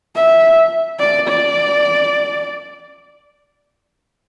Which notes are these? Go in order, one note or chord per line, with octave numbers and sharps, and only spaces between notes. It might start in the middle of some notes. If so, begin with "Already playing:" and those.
E5
D5
D5